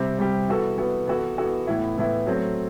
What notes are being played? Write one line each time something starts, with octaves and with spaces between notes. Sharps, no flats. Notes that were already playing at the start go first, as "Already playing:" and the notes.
Already playing: C3 G3 C4 G4
C3 G3 C4 G4
E3 B3 F#4 A4
E3 B3 F#4 A4
E3 B3 F#4 A4
E3 B3 F#4 A4
A2 E3 B3 E4
A2 E3 B3 E4
F#3 A3 C4